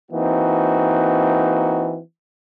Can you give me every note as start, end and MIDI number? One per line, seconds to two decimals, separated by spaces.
0.11 1.99 52
0.11 1.99 58
0.11 1.99 60
0.11 1.99 63
0.11 1.99 66